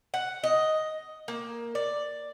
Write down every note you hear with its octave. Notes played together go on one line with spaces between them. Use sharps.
F#5
D#5
A#3
D5